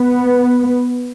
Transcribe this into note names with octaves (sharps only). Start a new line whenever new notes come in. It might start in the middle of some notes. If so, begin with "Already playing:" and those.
Already playing: B3